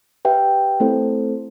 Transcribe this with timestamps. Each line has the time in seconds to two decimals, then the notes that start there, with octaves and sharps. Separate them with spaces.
0.25 G4 B4 E5 G5
0.80 A3 C4 E4 A4 C5